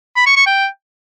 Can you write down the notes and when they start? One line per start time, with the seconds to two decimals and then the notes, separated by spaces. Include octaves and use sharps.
0.17 B5
0.27 C#6
0.37 C#6
0.47 G5